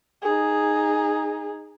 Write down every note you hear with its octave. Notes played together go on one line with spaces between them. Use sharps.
D#4 G#4